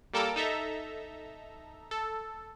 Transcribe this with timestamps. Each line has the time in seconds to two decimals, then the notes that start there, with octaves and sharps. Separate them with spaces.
0.13 G3 A#3 A4 A#4 D6 E6
0.36 D#4 A4 E5 A#5
1.91 A4